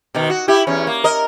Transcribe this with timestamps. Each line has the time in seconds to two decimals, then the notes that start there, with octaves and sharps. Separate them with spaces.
0.14 B2 D#3
0.30 F#4
0.48 E4 G4
0.67 E2 C#4
0.87 A#3
1.04 A#4 D#5